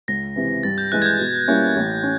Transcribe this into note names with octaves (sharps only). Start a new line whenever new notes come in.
C#2 A#6
C3 E3
G2 A6
G6
E3 G#3 F#6
G#6
G6
B2
G3 A#3 C#4 E4
A1
C#4